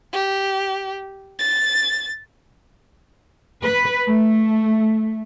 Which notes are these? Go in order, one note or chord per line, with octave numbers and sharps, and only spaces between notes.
G4
A6
B4
A3